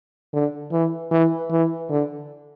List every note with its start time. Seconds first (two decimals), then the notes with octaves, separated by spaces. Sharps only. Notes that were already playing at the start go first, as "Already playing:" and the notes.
0.33 D3
0.72 E3
1.11 E3
1.51 E3
1.90 D3